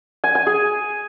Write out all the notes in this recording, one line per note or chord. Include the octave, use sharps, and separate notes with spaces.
G#5
G#5
G#4